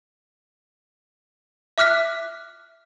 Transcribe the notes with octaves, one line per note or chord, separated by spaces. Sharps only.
E5 D6 F6 F#6 B6